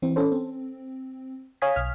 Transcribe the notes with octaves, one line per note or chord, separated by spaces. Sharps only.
E3 C4
C#4 A4 C5
C4
C#5 F5 G#5 D#6 G#6 B6
B1 F6